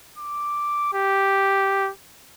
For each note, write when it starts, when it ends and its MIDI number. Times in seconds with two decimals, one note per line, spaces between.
0.18 0.91 86
0.93 1.91 67